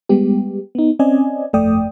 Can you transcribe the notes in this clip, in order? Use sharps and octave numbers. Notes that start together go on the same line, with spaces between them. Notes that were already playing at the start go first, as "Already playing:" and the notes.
G3 G#3 B3 G4
B3 D#4
C4 C#4 D5 D#5 G#5
G1 F2 A3 D5 G5 D#6